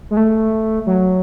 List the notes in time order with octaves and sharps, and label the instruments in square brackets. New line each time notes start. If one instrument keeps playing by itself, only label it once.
[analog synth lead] G#3
A3
F#3